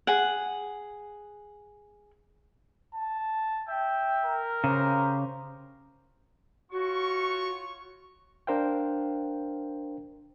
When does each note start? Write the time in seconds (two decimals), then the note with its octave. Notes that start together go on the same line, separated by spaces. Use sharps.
0.07 G#4 F#5
2.95 A5
3.68 E5 G5
4.26 A#4
4.64 C#3 G4 C5 A#5
6.72 F4 F#4 C#5 C#6
8.47 D4 A#4 C5 F5 G5